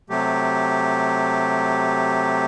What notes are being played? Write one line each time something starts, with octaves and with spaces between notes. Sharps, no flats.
C3 F#3 A3 G4